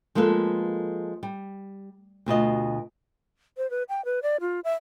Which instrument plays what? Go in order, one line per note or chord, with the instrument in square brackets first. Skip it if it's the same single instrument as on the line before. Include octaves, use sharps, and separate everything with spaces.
[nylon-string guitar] F3 G#3 A#3 A4 B4
G3
D2 B2 F4 D#5
[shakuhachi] C5
B4
G5
B4
D5
F4
E5